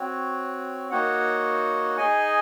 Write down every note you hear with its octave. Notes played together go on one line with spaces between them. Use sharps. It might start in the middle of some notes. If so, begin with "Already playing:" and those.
Already playing: C4 F#4 C#5
A#3 D#4 F#4 C#5 F#5
D#4 G#4 D#5 G#5